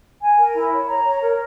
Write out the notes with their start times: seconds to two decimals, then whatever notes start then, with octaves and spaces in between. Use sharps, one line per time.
0.21 G#5
0.37 A#4
0.54 E4
0.71 C#5
0.88 A#5
1.04 C#5
1.21 A#4